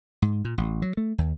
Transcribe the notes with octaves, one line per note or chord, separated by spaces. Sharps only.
G#2
A#2
A1
F#3
A3
D#2